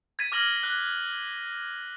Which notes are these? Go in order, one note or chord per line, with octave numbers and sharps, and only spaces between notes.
G#6 A6 B6 D#7
D6 F6 A#6 F#7 G7
F#6 G7